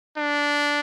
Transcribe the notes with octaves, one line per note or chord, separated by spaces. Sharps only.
D4